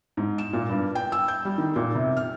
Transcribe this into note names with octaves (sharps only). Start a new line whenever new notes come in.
G#2
E7
A#2
G2
G5
E6
G6
G3
D#3
A#2
C3
F6